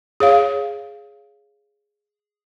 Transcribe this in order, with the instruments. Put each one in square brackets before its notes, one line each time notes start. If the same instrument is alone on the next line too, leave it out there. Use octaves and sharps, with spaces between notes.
[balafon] G#4 C#5 F5